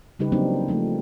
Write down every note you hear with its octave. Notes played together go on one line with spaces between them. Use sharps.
C#3 G3 D#4 G4 B4
F3 F#3 A#3 C4 D4 D#4
F3 A3 D#4